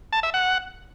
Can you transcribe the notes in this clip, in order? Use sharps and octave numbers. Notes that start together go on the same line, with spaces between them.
A5
E5
F#5